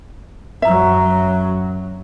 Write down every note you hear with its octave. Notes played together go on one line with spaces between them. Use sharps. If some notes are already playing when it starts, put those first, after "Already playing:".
F#2 F#3 E5 A#5